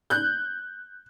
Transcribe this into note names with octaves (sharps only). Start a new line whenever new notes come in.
F#6 G6